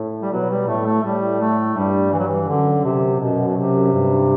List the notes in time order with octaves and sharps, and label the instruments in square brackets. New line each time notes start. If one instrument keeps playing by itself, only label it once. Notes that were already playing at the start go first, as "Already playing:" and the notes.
Already playing: [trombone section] A2
[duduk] G3
[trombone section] B2 [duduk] F#3
[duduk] G3
[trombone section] A2 [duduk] A3
[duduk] A3
[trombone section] A2 [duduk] G3
[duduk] A3
[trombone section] G2 [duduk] G3
[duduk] E3
F#3
E3
[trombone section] F#2 [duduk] D3
[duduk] C3
[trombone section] F#2 [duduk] B2
[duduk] B2
C3
[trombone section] G2